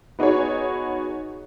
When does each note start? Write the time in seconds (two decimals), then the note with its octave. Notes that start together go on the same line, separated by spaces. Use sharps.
0.19 B3 D#4 F#4 G#4 C#5